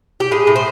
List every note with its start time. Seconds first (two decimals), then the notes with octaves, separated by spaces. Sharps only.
0.20 G4
0.31 A2 G#4
0.47 A2
0.56 C5